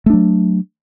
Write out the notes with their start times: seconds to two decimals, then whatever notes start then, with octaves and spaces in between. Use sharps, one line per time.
0.06 A3
0.10 D4
0.13 F#3